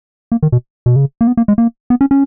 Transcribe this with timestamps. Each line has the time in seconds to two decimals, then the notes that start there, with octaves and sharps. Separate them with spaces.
0.32 A#3
0.43 D#3
0.52 B2
0.86 B2
0.96 C#3
1.21 A#3
1.27 B3
1.37 A#3
1.48 G#3
1.58 A#3
1.90 B3
2.01 C#4
2.11 C#4